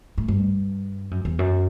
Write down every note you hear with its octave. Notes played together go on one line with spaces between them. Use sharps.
A2
G2
F#2
E2
F#2